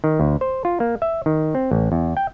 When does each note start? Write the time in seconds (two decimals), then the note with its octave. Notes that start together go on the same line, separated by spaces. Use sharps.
0.04 D#3
0.20 D2
0.41 C5
0.65 F4
0.80 A#3
1.02 E5
1.26 D#3
1.55 C4
1.71 A1
1.92 E2
2.17 G5